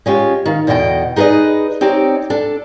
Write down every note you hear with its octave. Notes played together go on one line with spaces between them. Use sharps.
G#3 C#4 F4 G4
D#3 F5
E2 B2 D3 D#5 G5
D#4 G#4 B4 D5 D#5
C4 D#4 G4 C#5 D5
D4 A4